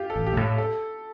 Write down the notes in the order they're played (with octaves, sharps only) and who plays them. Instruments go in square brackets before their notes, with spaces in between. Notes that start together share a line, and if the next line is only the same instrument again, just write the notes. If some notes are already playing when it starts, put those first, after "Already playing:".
Already playing: [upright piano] F4 G4
A4
[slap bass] A1
[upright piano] G4
[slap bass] A2
[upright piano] A4